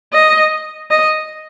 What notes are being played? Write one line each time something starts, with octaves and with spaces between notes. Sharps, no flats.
D#5
D#5